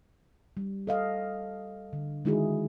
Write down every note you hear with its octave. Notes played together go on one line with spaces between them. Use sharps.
G3
A4 D#5 F5
D3
D#3 G#3 D#4 E4 F#4 G#4